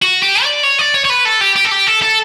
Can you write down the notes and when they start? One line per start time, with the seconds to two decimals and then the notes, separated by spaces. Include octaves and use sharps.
0.02 F#4
0.22 G4
0.43 D5
0.64 C#5
0.79 D5
0.94 C#5
1.05 C#5
1.10 B4
1.25 A4
1.41 G4
1.56 G4
1.65 A4
1.72 G4
1.87 A4
2.02 A4